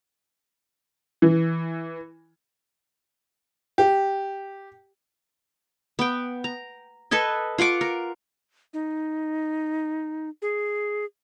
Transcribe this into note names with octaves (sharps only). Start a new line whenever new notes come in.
E3
G4
B3 G5
A#5
A4 B4 D#5 G#5
F4 F#5 C#6 D6
A#4
D#4
G#4